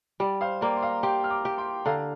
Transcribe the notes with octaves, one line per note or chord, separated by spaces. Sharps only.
G3 D5
C5 F5
A#3 D5 G5
C6
F5 A#5
G4 G5 C6
F6
A#5 D6
G4
G5 C6
D3 F5 A#5